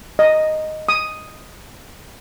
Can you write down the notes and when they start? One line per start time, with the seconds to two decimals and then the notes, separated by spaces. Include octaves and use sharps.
0.19 D#5
0.89 D#6